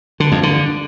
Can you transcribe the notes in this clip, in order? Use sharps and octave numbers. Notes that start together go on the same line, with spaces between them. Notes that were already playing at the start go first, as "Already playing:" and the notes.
D3
F2
D3